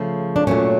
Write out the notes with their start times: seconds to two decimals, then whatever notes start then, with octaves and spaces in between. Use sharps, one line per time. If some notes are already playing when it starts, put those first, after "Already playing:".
Already playing: C#3 F3 A3
0.36 D4
0.47 A#2 F#3 A3 C#4